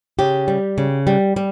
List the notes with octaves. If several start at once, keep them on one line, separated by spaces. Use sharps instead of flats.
C#3 G4
G3
C#3
G3
G3